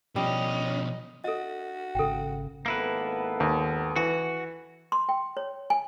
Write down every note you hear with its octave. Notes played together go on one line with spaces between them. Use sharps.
B2 F3 G3 C#4 D#5
F#4 A4 D#5
G#1 C#3 A4 G5
G#1 A#3 B3 E4 A4 B4
D#2
E3 F#4
C6
G5
C#5
G#5